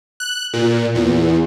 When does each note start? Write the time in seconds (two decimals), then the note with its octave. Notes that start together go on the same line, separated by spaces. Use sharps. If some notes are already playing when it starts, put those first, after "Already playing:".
0.20 F#6
0.53 A#2
0.95 E2